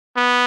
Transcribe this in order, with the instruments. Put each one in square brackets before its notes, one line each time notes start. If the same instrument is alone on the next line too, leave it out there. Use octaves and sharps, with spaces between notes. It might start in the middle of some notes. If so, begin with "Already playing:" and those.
[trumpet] B3